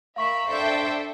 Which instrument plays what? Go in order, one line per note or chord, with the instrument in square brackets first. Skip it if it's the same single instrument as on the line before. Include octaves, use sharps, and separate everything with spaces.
[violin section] A#4 E5 B5 [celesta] F5 C#6 B6
[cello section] D4 C5 D5 [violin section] A4 E5 G5